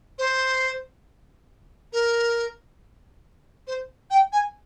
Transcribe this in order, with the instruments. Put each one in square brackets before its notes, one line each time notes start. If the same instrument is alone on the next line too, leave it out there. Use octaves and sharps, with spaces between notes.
[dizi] C5
A#4
C5
G5
G#5